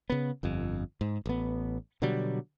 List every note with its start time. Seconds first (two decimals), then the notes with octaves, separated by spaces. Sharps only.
0.10 C#3 B3
0.43 G1 F2
1.01 G#2
1.26 A1 B3
2.02 B2 D3 F#3 G3